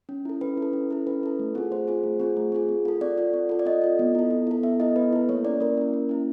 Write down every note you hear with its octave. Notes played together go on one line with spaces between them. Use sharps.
C#4
E4 A4
C#4 B4
E4
A4
C#4
E4 A4
C#4 B4
E4 A4
A3
C4 F4 G#4
A3 C5
C4 F4 G#4
A3
C4 F4 G#4
A3
C4 F4 G#4
C4
F4 A4
C4 D5
F4 A4
C4
F4 A4
D5
C4 D#5
F4 A4
B3
E4 A4
B3
E4 A4
B3 E5
E4 A4 D#5
B3 B4
E4 A4
A#3 C#5
C#4 E4 D5
A#3 A#4
C#4 E4
A#3
C#4 E4